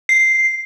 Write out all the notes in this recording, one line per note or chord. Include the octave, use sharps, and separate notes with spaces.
C7